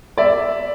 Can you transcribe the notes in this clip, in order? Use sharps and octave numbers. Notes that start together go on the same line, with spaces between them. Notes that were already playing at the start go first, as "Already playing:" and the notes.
D5 E5